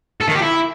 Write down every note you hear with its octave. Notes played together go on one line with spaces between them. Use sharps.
A4
D#3
G4
E4